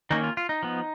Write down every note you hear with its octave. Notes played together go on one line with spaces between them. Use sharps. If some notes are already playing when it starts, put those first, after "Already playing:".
D#3 A#3 C#4 D#4
F4
F4
D#4
F3 B3